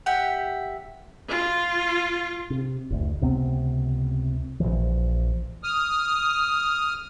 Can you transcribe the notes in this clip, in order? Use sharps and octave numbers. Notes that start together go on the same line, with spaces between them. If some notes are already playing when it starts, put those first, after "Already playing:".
G4 E5 F#5
F4
C3
F#1 D2
C#2 C3 B3 C4
A#1 C#3 E3 F3
D#6 F6